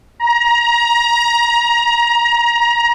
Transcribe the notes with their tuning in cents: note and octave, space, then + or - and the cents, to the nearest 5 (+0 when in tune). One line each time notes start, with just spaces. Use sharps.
A#5 +25